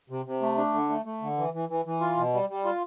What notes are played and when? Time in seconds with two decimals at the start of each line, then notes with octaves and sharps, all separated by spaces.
0.10 C3
0.25 C3
0.41 A3
0.57 D4
0.74 D3
0.89 A3
1.05 A3
1.22 D3
1.37 E3
1.54 E3
1.69 E3
1.85 E3
2.01 F4
2.17 B2
2.33 G3
2.49 G3
2.65 F4